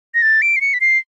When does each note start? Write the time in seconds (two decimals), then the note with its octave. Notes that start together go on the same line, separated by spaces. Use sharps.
0.15 A#6
0.22 A6
0.42 D7
0.56 C7
0.61 C#7
0.74 B6
0.81 C7